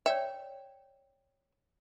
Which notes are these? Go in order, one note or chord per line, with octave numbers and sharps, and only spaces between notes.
C#5 D5 E5 G5